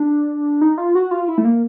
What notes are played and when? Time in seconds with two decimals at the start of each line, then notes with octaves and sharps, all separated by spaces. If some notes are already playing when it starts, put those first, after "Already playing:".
Already playing: D4
0.61 D#4
0.78 F4
0.95 F#4
1.11 F4
1.28 E4
1.38 A3
1.45 A#3